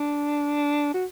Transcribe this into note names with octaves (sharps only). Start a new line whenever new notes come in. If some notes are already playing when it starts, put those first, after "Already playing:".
Already playing: D4
F#4